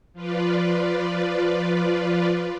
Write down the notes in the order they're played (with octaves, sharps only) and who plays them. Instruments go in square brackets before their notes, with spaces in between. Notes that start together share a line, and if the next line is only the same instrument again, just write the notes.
[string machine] F3 F4 B4 D5